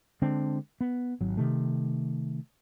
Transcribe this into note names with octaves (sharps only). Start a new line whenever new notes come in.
D3 G#3 C4 D4
B3
G#1 F#3
C3 D#3 A3